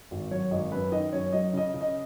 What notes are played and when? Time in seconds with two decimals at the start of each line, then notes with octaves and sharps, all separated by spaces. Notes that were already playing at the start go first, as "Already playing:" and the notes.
0.11 G#1
0.31 F#3 C#5
0.51 G#1 D#5
0.72 F#2 B4
0.92 D#3 D#5
1.13 F#2 C#5
1.32 F#3 D#5
1.53 C#3 D#5
1.74 C#3
1.81 D#5